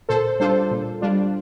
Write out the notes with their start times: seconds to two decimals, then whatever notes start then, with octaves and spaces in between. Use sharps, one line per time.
0.09 A#2 A4 C5
0.40 G3 D4 F4 A4 C5
0.71 A#2
1.01 G3 D4 F4